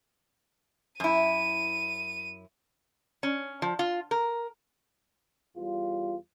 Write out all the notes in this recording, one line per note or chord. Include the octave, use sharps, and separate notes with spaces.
F#2 E4 D#7
C#4
F3
F4
A#4
E2 G3 F4